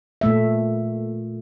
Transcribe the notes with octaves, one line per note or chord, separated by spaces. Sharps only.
A#2 A3 E5